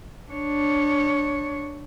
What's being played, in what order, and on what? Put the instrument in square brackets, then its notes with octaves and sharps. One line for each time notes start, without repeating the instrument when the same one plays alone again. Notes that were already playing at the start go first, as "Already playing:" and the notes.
[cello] D4 C#5